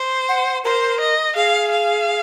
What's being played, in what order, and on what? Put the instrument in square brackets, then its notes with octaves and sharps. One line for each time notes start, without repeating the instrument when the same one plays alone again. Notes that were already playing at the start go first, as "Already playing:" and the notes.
Already playing: [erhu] C5
[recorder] F#5
[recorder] A#4 [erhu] C5
[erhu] D#5
[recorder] G#4 [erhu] F5
[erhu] F5